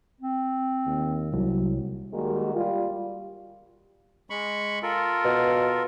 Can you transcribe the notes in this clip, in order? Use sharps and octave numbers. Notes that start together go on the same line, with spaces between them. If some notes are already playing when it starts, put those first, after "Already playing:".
C4
D#2
C2 F#3
D#3 G3 G#3 A#3 F#4
G3 F4
G#3 B5 C#6
F4 A4 A#4
B2